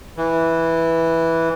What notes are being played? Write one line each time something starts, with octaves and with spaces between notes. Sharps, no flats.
E3